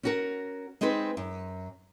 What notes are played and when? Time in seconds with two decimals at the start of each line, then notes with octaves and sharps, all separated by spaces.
0.03 C#4 F#4 A#4
0.81 G#3 C4 D#4 G#4 B4
1.17 F#2